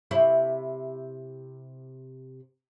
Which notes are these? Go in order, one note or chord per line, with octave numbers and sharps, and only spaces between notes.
C3 E4 C#5